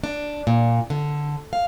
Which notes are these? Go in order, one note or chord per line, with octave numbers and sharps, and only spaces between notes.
D4
A#2
D3
F5